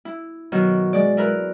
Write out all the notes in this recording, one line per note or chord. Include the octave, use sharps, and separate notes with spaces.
E4
B2 D#3 F#3
G#3 D5
E4 A#4 B4